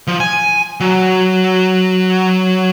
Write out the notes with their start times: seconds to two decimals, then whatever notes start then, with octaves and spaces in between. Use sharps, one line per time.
0.08 F3
0.20 G#5
0.80 F#3